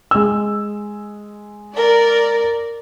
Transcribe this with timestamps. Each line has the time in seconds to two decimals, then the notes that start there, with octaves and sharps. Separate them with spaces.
0.11 G#3 E6
1.74 A#4 D5